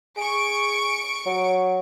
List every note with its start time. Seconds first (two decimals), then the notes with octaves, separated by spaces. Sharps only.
0.17 G#4 C#6 D7
1.26 F#3